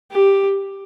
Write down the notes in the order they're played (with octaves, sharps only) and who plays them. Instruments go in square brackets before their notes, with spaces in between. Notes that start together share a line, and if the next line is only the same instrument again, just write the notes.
[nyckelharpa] G4